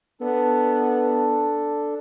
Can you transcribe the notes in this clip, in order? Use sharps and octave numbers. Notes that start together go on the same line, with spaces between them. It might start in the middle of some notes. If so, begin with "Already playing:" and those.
B3 D4 A4